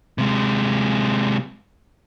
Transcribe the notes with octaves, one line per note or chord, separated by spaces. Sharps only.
C3 G#3